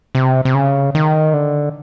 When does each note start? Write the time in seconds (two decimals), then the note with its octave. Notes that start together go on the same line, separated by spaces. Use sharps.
0.15 C3
0.45 C3
0.54 C#3
0.95 D#3
1.33 D3